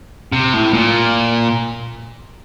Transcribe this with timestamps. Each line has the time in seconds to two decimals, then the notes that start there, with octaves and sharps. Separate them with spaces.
0.32 C3
0.53 A2
0.73 A#2